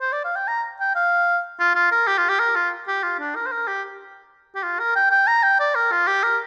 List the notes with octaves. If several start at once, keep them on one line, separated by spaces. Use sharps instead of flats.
C5
D5
F5
G5
A#5
G5
F5
F4
F4
A#4
G4
F4
G4
A#4
F4
G4
F4
D4
A#4
C5
A#4
G4
G4
F4
A#4
G5
G5
A#5
G5
D5
A#4
F4
G4
A#4